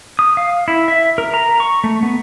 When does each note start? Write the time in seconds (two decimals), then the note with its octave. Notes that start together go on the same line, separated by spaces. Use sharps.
0.19 D#6
0.37 F5
0.68 E4
0.88 E5
1.18 A#4
1.34 A#5
1.60 C#6
1.84 A3
2.03 B3